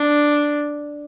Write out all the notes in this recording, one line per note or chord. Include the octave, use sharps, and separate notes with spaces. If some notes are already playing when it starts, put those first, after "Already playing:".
Already playing: D4